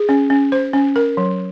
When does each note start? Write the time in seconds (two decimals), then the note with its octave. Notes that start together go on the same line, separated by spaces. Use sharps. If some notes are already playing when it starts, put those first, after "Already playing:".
Already playing: G#4
0.09 C#4
0.30 C#4
0.52 C5
0.73 C#4
0.96 A#4
1.17 F#3